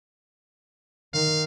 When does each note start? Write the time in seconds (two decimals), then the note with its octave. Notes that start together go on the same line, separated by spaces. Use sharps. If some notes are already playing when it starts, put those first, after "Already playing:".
1.14 D#3 F5